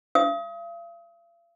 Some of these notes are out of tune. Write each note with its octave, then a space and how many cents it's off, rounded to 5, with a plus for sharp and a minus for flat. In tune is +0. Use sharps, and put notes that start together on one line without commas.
F5 -45 D#6 +35